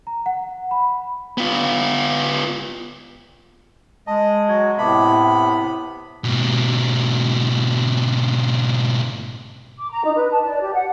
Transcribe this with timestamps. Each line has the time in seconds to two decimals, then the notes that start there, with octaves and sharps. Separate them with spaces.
0.07 A#5
0.26 F#5
0.71 B5
1.38 B3 F4
4.07 G#3 D#5 A5
4.49 F#3 F#4 G#6
4.78 A2 C3 B3 E5 A5 B5 D6
6.24 G#2 B2
9.78 D6
9.91 A#5
10.04 D#4
10.15 B4
10.31 A5
10.45 D5
10.61 G4
10.75 F#5